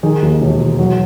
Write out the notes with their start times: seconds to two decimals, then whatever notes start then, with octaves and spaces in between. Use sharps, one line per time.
0.03 D#3 G#4
0.22 D#2
0.41 E1
0.60 E1
0.79 F#3